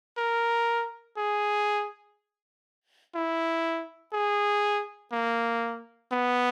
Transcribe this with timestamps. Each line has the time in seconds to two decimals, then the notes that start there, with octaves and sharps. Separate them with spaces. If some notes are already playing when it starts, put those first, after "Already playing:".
0.18 A#4
1.17 G#4
3.15 E4
4.13 G#4
5.12 A#3
6.12 B3